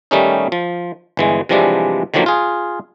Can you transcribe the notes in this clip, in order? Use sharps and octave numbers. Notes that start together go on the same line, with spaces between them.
D#3 G3 A3 C#4 D#4
F3
G1 E3 G#3
C3 E3 F3 G3 G#3 D4
D3 D#3 F3 F#3 A#3
F4 G#4